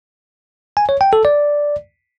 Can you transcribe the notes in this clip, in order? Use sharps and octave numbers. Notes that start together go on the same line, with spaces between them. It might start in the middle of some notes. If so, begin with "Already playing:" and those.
G#5
C#5
G5
A4
D5